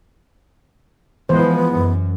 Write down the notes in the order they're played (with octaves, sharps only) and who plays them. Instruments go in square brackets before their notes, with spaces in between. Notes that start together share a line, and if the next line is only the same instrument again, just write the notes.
[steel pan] E3 C5 [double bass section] F3 G#3 [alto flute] B3
[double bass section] F#2